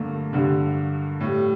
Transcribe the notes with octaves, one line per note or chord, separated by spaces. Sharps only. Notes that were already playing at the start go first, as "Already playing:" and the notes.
Already playing: G2 D3 A3 A#3
G2 D3 G3
A2 G3